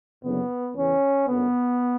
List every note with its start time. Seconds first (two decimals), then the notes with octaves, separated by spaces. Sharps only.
0.23 F#1 E2 D3 F#3 B3
0.75 E2 C#3 E3 C#4
1.29 G1 F#2 D3 B3